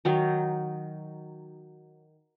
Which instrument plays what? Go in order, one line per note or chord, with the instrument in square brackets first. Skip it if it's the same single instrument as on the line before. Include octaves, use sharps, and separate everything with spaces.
[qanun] D#3 F#3 D#4